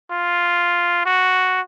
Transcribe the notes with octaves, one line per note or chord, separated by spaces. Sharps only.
F4
F#4